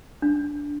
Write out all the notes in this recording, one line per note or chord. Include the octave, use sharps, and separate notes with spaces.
D4